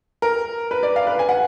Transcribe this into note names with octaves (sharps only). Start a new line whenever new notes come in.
A#4
B4
D5
F5
B4
G#5
F#5